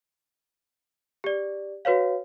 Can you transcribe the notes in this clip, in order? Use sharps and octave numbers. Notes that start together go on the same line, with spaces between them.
G4 D5
F#4 B4 C#5 F5